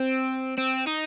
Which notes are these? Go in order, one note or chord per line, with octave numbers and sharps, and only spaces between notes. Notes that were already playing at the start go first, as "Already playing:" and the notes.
Already playing: C4
C4
D#4